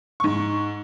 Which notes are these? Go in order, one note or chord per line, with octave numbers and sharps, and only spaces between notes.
G#2 C#6